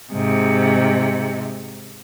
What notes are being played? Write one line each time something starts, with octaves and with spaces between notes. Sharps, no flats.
G#2 C3